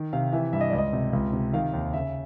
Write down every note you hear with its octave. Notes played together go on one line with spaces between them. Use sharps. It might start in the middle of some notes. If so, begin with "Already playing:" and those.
Already playing: D#3
C3 F5
E3 E5
G2 E5
D#5
C#2 D5
D#5
C3
C#2
C3
D#3 F5
D#2
C#3 E5